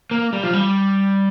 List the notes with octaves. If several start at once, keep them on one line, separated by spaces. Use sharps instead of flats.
A#3
G3
F3
G3